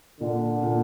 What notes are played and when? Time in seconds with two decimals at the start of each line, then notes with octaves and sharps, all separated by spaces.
0.20 A#2 D3
0.63 A#2